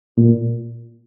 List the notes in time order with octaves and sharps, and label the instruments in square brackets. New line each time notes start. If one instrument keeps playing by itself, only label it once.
[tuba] A#2